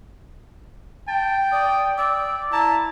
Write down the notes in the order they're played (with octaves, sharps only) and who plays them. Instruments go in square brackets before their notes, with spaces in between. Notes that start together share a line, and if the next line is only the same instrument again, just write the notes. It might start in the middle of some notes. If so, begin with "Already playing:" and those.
[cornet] G5 [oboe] A5
[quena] D5 [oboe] D#6
[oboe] D5 [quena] E6
[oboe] E4 [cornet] A5 [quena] A#5